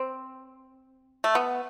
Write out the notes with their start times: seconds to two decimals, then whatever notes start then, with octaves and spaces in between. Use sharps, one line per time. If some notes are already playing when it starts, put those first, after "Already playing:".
Already playing: C4
1.24 A3
1.35 B3